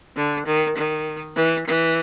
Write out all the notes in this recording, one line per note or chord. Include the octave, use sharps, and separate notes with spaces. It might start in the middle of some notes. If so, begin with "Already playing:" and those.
D3
D#3
D#3
E3
E3